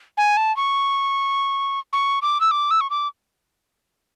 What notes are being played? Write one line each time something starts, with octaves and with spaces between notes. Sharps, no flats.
G#5
A5
C#6
C#6
D6
E6
D6
E6
C#6
D6